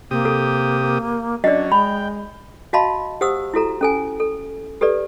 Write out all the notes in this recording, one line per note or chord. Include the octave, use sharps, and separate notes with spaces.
C3 A#3 G4 D#6
A4
F#3 C#4 D4 D5 D#5
G#3 G5 B5
F#4 D#5 F5 A5 B5 C6
G4 C5 F#5 D#6 E6
E4 F#4 A4 A#5
C#4 A4 G#5
A4
G4 A4 B4 D5